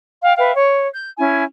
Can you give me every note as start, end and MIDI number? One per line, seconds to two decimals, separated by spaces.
0.23 0.37 77
0.23 0.37 79
0.37 0.53 71
0.37 0.53 76
0.37 0.53 77
0.37 0.53 79
0.54 0.87 73
0.94 1.10 91
1.18 1.42 61
1.18 1.42 64
1.18 1.42 80